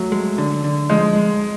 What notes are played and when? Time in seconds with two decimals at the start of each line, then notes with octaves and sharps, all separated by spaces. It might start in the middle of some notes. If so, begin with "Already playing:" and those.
Already playing: F#3 A3
0.12 G#3
0.38 D3
0.64 D3
0.90 F3 G#3
1.16 G#3